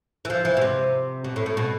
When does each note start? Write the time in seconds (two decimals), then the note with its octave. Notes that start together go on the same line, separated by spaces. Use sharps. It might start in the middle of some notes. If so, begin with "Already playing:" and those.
0.25 E3
0.30 F3
0.45 E3
0.57 B2
0.62 C3
1.24 B2
1.36 A2
1.46 A2
1.57 B2